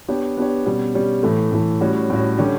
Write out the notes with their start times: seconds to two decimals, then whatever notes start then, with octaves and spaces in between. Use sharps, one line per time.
0.08 B3 D4 G4 C#5
0.37 B3 D4 G4 C#5
0.66 B2 G3 C#4
0.95 B2 G3 C#4
1.23 A2 E3 A3
1.52 A2 E3 A3
1.81 A2 G3 C#4 F#4
2.10 A2 G3 C#4 F#4
2.38 D3 G3 C#4 G4